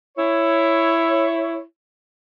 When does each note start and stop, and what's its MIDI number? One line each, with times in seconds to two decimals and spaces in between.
0.18 1.61 64
0.18 1.61 73